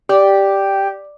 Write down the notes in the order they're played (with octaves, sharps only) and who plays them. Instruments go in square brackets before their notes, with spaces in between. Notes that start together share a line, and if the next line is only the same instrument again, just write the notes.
[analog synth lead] G4 [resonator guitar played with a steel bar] D5